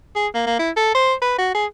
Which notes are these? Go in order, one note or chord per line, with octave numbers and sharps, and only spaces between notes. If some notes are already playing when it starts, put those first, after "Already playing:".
G#4
A#3
A#3
E4
A4
C5
B4
F#4
G#4